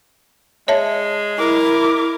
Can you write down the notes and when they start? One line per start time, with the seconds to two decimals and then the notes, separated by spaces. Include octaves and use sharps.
0.68 G#3 C#5 E5 A5
1.38 E4 A#4 D6